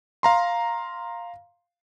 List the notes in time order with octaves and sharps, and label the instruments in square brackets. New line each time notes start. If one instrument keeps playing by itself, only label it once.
[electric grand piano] F5 A#5 C6